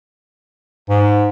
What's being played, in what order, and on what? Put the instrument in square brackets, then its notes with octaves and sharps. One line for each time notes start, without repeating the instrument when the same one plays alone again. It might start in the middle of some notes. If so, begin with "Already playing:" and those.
[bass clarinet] G#2